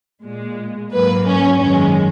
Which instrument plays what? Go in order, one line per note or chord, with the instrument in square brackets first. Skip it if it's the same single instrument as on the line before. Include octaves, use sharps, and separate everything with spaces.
[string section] A#2 G#3
G#2 F#3 A#3 B4
C#4
F#2 D#3 G#3 C#4